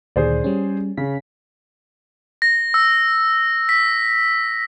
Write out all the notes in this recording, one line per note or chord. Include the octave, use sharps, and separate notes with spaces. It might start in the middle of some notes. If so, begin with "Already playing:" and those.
D2 A#2 D#3 G#4 C5 D5
G3 C#4
C#3 B6
A#6
E6
B6